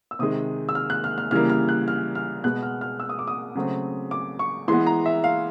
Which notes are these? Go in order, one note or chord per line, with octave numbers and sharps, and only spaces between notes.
E6
C3 D#3 G#3 D#6
E6
F6
F#6
F6
F6
C#3 E3 G3 A#3 F6
F6
F#6
F6
F6
B2 G#3 B3 F#6
F6
F6
E6
D#6
D6
D#6
C#3 F#3 A3 C4
D6
C#6
E3 G#3 B3 C6
A#5
E5
F5